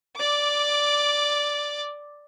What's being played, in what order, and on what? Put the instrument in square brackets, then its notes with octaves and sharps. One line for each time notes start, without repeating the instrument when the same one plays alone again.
[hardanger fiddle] D5 D6